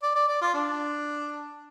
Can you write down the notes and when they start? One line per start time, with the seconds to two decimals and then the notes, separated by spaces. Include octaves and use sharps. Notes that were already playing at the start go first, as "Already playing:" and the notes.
0.03 D5
0.15 D5
0.28 D5
0.42 F4
0.54 D4